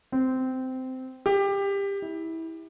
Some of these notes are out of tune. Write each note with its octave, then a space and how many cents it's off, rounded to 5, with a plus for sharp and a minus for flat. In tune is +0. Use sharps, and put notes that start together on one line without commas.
C4 -15
G4 +20
E4 -20